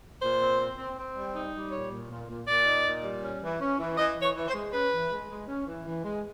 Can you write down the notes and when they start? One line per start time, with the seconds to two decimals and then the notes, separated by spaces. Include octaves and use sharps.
0.22 A#2 C5
0.41 C4
0.59 C4
0.77 C4
0.96 C4
1.15 G3
1.34 D#4
1.53 G3
1.71 A#2 C#5
1.91 A#2
2.09 A#2
2.28 A#2
2.47 A#2 D5
2.67 D#4
2.85 A#2
3.04 G3
3.23 C#4
3.41 E3
3.60 C#4
3.78 E3
3.97 E3 D#5
4.16 E3
4.22 C#5
4.35 E3
4.48 C5
4.54 G#3
4.73 C#4 B4
4.92 E3
5.10 G#3
5.29 G#3
5.48 C#4
5.67 E3
5.86 E3
6.04 G#3